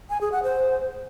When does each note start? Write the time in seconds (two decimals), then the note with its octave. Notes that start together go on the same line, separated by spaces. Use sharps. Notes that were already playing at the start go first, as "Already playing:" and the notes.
0.10 G#5
0.21 G#4
0.32 F#5
0.43 C5